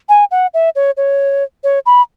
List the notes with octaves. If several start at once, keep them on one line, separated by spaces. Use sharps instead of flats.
G#5
F#5
E5
C#5
C#5
C#5
B5